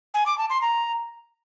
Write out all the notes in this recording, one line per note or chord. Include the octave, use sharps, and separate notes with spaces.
G#5
D6
A5
C6
A#5